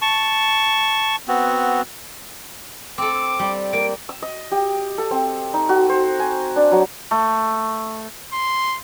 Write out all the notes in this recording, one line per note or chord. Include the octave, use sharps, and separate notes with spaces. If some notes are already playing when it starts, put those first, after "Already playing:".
A5 C#6
B3 C4 F#4
C4 A4 D6
G3
A#3 D7
E6
D#5
G4
A4
C4
D#4
F#4
C5
G#5
D4
F#3
A3
C6